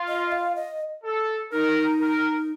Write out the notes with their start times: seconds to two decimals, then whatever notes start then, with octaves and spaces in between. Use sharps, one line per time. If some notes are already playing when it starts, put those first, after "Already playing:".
Already playing: F4
0.08 D#5
0.32 F5
0.56 D#5
1.04 A4
1.52 D#4 A#4
2.00 A#4